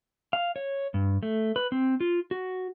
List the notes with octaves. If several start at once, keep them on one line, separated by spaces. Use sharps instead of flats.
F5
C#5
G2
A3
B4
C4
F4
F#4